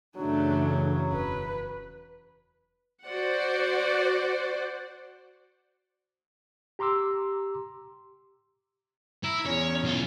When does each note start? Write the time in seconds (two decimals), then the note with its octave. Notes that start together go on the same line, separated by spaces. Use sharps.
0.17 F#2 C#3 E3 F#3 A3 D4
1.12 E1 B4
3.04 F#4 C5 D5 F#5
6.79 G4 A#5 C6 D6 E6
9.24 E4 A#5
9.46 E2 C#4 C#5
9.84 B1 F4